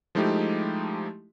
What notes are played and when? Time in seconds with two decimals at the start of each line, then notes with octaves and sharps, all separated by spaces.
0.15 F3 G#3 A3 D#4 E4 G4